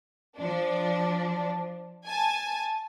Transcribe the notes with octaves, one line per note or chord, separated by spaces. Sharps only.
F3 D4
G#5 A5